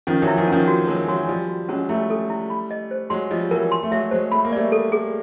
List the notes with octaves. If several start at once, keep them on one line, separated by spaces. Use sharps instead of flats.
D#3 F3 C#4
E3 F#3
E4
D#3 F3
D#3 F3 C#4
F#4
F#3 G#3 A#4
E3 F#3 F#4
F3 G3 D5
F#4
F#3 G#3 C#4
G3 A3 E4
A4
E4
B5
D#5
C5
F#3 G#3 C6
F3 G3 D#5
E3 F#3 A#4
C6
A3
F#3 G#3 E5
F#3 G#3 C5
A3 B5
A#3
G3 A3 D5
A4
G#4